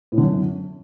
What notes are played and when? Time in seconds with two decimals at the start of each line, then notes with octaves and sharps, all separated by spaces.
0.12 A2
0.17 D3
0.23 F#2